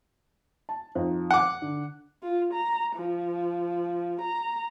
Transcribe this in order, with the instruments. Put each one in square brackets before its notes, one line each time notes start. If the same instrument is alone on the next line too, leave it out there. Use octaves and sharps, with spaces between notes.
[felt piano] A5
F2 D#4
[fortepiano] F#5 D6
[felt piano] D3
[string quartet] F4
A#5
F3
A#5